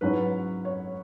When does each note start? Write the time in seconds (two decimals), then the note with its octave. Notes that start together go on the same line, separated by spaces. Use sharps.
0.01 G#2 F#3 C#4 E4 B4
0.65 C#5